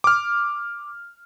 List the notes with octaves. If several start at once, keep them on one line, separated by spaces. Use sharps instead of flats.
D6 F6